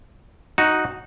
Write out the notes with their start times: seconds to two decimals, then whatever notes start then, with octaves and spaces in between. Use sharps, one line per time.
0.58 D#4 F#4